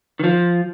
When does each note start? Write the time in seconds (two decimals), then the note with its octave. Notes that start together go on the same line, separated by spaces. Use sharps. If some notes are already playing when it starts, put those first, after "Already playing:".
0.19 D#3
0.24 F3